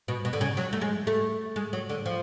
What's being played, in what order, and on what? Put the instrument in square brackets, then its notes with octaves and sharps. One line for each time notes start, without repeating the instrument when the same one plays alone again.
[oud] B2
B2
D3
C#3
F#3
A3
G#3
A3
G#3
F#3
D3
F3